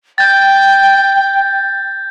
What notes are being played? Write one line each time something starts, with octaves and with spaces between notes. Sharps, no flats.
G5 G6 A6